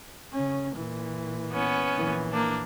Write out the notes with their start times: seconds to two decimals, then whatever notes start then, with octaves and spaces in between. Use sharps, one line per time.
0.32 C#3 C#4
0.75 A#2 E3
1.52 B3 C#4
1.95 A#1 E3
2.32 A#3 D4